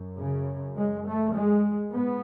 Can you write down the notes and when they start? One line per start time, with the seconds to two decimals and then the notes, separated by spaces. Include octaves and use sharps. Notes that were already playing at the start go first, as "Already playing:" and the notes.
Already playing: F#2
0.19 C#3
0.77 G#3
1.07 A3
1.35 G#3
1.92 G#2 B3